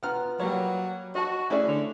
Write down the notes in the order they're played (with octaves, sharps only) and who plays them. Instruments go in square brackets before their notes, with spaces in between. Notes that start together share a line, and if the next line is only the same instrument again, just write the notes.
[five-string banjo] B3 F4 A#5 [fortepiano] F#5 F6
[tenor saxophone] F#3 [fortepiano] G3 A#3 C#5
[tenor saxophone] F#4 [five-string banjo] D#5 A5
[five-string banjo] A3 D5 [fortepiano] C#4 E4 G#4
[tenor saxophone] D3